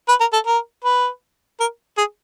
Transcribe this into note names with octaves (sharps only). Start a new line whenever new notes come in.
B4
A#4
A4
A#4
B4
A#4
G#4